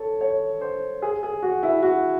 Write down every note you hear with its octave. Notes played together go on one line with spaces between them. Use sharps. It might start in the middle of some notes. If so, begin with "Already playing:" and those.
Already playing: A4 C#5
C#5
C5
G#4
G#4
F#4
E4
F#4